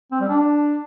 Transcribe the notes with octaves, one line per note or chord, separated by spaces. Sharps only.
C4
G3
D4